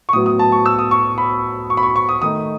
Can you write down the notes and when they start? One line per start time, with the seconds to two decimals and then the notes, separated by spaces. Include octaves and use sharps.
0.09 C#6
0.13 A2 F#3 B3 D#6
0.26 D#6
0.39 A5
0.52 C#6
0.66 E6
0.79 D#6
0.91 C#6
1.18 B5
1.70 C#6
1.77 B5
1.83 C#6
1.96 C#6
2.09 D#6
2.22 D#3 A3 D#4 D#6